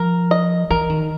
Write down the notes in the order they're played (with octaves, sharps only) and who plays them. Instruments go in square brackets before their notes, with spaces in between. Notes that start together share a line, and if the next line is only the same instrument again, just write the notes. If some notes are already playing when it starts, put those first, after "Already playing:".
Already playing: [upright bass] F3 [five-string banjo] A#4
[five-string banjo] D#5
[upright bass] E3 [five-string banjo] A#4
[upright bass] D#3